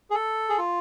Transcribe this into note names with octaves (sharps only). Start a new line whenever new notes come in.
G#4
A4
G#4
F4